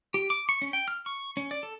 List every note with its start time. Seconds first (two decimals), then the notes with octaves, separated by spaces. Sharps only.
0.14 G4
0.30 D6
0.49 C#6
0.62 C#4
0.73 G5
0.88 F6
1.06 C#6
1.37 C#4
1.51 D5
1.63 A4